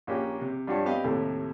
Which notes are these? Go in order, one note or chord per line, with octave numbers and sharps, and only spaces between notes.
A#1 A#3 C#4 G4
C3
G2 F3 F#4 G4 C#5 A5
B3 C4 G4 D#5 F5
D#2 A2 C3 A3